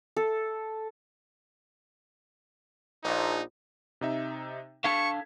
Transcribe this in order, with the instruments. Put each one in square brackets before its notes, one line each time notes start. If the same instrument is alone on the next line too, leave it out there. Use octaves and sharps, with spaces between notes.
[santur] A4
[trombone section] A#1 [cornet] D#4
[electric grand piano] C3 D#4 E5
[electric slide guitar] D4 A4 F5 [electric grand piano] A5 G#6 B6 [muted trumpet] C#6